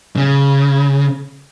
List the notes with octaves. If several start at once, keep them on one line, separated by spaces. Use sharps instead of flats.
C#3